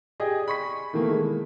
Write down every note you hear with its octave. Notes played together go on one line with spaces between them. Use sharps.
G4 G#4 D5 D#5
B5 C#6 B6
B2 D#3 E3 A3 A#3
G#3